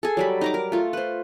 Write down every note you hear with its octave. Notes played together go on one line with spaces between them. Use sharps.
G#4 A4
F#3 G3 B5
D#4 A#5 D6
A#4
A3 F4
B4 C5